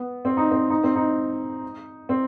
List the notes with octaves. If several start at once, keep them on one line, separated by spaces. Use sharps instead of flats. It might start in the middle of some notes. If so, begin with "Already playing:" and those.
Already playing: B3
C4
D#4
C4
D#4
C4
D#4
C4